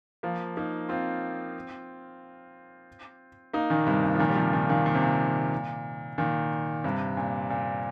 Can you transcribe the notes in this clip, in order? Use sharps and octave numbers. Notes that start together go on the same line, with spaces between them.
F3 A#3
A#3 D#4
C4 F4
A#3 D#4
A#2 D#3
G2 C3
A#2
F3
A#2 D#3
G3
C3 F3
A#2 D#3
A#2 D#3
A#2
C3
A#2
A#2 D#3
G2 C3
A#2
A#2